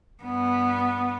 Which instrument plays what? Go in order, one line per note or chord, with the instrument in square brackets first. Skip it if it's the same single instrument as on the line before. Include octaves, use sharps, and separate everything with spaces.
[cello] G2 B3